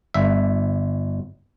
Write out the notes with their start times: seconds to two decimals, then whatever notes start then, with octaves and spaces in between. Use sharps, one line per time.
0.14 G1 E5